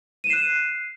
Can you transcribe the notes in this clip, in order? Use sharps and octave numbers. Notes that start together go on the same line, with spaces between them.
F#6 C7 D#7 E7